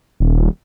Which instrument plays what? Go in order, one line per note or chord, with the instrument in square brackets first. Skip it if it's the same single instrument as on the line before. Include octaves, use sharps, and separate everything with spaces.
[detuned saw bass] D#1